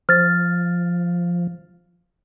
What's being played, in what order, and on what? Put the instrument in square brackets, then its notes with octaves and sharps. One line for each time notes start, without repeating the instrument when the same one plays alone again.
[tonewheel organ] F3 [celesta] F6 A6